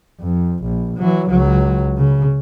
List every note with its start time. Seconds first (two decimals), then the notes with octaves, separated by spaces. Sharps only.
0.21 F2
0.64 A#1
0.98 E3 F#3
1.29 C#2 F#3
1.97 C#3